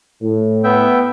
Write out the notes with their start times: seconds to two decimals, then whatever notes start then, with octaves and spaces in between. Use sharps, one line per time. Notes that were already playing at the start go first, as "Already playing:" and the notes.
0.21 A2
0.64 B3 E5 G5